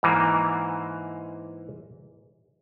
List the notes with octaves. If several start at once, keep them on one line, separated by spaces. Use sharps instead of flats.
G#2 E3 A#3